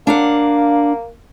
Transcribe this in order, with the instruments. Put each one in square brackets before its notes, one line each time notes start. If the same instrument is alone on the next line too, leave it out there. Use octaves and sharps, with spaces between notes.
[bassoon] A#3 [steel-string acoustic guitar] D4 F5 F#5